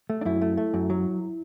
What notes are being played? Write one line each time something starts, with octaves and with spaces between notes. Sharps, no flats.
A3
D4
F#2 E4
A3
A3
F#2
F#3